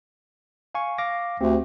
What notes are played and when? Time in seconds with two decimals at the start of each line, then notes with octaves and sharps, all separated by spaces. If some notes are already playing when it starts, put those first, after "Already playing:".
0.75 F5 G#5 C#6
0.98 F5 D6 A#6
1.41 D2 C4 G4